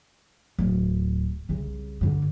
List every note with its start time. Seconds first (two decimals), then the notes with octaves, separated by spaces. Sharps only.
0.59 D1
1.49 C2 C#3
2.01 G2 D3